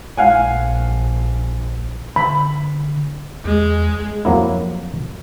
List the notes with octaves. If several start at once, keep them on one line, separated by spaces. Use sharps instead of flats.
A#1 F5 F#5 G#5
D3 B5
E2 G#3
F2 F#3 A#3 E4